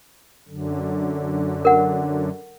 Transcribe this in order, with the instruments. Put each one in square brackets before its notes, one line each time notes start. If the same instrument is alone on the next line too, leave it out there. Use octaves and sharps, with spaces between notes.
[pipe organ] F#2 D3
[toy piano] A#4 F#5